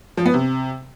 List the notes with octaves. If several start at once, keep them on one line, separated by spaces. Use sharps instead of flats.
F3
B3
C3